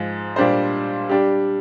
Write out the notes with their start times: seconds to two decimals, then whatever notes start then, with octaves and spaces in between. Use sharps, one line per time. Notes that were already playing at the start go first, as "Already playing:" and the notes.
Already playing: G#2 F3 G#3
0.36 A#2 G3 D4 G4 C5
1.09 G3 D4 G4